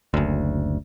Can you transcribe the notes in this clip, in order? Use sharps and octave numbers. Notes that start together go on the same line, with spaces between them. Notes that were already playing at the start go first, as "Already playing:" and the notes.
F#1 D2